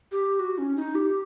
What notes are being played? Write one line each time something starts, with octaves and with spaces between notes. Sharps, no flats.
G4
F#4
C#4
D#4
G4